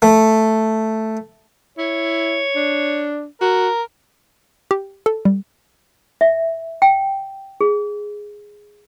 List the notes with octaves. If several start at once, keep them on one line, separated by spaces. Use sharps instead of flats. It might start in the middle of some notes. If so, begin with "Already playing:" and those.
A3
E4 C#5
D4
F#4 A#4
G4
A4
G3
E5
G5
G#4